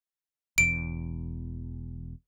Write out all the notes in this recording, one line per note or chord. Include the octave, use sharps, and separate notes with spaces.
E1 E2 D7